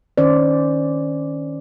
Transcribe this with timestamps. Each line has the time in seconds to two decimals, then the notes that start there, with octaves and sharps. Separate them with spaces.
0.18 D#3 C#4 C5 D5